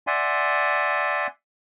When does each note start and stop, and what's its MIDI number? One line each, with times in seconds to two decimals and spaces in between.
0.07 1.27 74
0.07 1.27 76
0.07 1.27 78
0.07 1.27 80
0.07 1.27 84